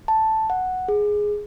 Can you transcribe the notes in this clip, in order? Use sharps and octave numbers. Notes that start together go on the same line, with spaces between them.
A5
F#5
G#4